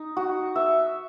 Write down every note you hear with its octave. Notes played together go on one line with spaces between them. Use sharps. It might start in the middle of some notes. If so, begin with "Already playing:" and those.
Already playing: D#4
F#4
E5